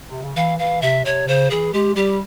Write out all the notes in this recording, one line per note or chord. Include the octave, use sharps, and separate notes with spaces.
C3
C#3
E3 F5
E3 F5
C3 E5
C3 C#5
C#3 C5
E3 G#4
G#3 G4
G3 G4